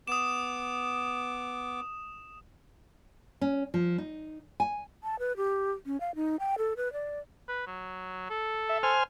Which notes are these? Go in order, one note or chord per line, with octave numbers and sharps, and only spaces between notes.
B3 D6 D#6 E7
C#4
F3
D#4
G#5
A5
B4
G4
C#4
F5
D#4
G5
A4
B4
D5
B4
F#3
A4
E5
C5 G#5 F6